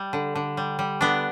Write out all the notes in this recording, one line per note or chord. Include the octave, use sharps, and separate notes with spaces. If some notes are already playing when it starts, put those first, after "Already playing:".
Already playing: G3
D3
D3
G3
G3
D3 B3 D4